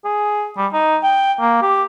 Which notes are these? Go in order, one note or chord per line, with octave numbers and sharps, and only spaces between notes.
G#4
G3
D#4
G5
A#3
G4